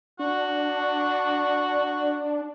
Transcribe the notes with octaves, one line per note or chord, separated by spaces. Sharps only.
D4 F#4